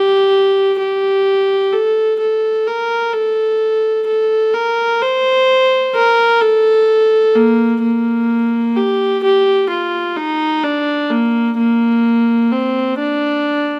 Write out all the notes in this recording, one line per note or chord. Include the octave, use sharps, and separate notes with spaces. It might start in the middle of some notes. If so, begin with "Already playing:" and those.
Already playing: G4
G4
A4
A4
A#4
A4
A4
A#4
C5
A#4
A4
A#3
A#3
G4
G4
F4
D#4
D4
A#3
A#3
C4
D4